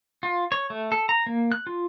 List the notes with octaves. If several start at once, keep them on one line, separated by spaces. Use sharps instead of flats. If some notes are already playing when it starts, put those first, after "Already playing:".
F4
C#5
A3
A4
A#5
A#3
F#6
F4